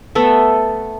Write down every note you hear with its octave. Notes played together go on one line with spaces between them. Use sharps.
A3 B3 A4 E5